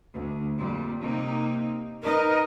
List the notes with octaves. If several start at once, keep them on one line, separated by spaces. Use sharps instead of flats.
D2
F2 A#2 G3
C3 A#3 D#4
D#4 A#4 B4 D#5